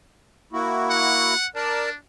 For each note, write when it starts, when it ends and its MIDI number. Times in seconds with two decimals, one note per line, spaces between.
0.53 1.34 58
0.53 1.34 64
0.53 1.34 66
0.90 1.47 78
1.55 1.96 62
1.55 1.89 70
1.55 1.89 74
1.55 1.89 81